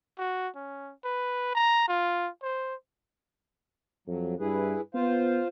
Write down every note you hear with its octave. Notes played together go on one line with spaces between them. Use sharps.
F#4
C#4
B4
A#5
F4
C5
F2 F#3
G2 E4 G#4 B4
B3 F4 C5 F5